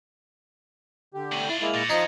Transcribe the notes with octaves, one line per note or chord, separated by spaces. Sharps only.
D3 G4
A2 C3 C#6 D#7 F#7
D4 E4 F4
G#3 A#3 E4 F7
A#2 A6 A#6 C#7
F2 F3 D#4 G#6 D#7